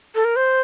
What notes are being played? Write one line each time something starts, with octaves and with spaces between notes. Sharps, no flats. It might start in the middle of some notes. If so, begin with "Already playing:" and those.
A4
A#4
C5